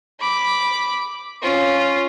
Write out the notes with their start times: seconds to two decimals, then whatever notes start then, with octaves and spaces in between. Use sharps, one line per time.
0.20 B5 D6
1.42 C#4 F4